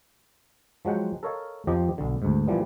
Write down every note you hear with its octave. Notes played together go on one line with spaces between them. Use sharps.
F3 F#3 G#3 F#5 G5
A4 A#4 C#5 D#5 F5
F2 F3 G4 D#5
B1 D3
D2 G#2
A#2 E3 F3 G3 B3